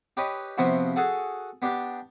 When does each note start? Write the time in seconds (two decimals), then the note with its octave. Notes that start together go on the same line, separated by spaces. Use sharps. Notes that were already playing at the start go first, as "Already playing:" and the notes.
0.17 G4 B4 C#5 D#5
0.58 C3 F3 B3 C4 E4 F#4
0.96 F#4 G#4 A4 F#5
1.62 B3 D4 G4